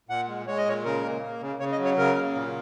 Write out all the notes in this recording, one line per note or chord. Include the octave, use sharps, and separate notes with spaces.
A#2 F#5
G#3
G#3 C#5
D#5
A#2 C#5
C#3 A#4
A#3
A#3
C#3
C#3 C#5
D#5
F#3
C#5
C#3 A#4
A#3
A#2